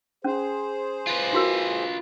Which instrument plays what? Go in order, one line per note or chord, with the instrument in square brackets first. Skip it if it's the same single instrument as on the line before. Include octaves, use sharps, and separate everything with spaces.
[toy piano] C#4 [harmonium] G#4 C5
[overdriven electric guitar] F4 B4
[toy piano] E4 F#4 A#4